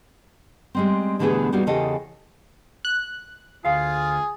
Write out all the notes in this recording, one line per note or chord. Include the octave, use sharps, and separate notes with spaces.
G3 G#3 C4
B2 D3 E3 A3 G4 G#4
G3 A#3 D#4 F#4 G4
E2 C#3 E3 G4 A4 D#5
F#6
D2 F4 G#4 F5